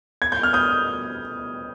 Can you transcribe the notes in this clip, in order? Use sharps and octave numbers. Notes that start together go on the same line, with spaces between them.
G#6
G6
F6
D#6 G6